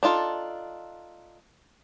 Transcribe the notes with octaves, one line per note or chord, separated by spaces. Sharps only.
D4 D#4 F4 A4